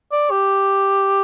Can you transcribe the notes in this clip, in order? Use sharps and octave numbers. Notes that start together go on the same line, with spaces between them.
D5
G4